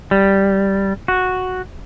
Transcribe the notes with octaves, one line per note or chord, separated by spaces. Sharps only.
G3
F#4